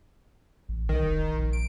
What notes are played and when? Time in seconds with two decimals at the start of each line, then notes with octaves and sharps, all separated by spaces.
0.69 A1
0.89 B1 D#3
1.03 E1
1.34 A#1
1.53 D7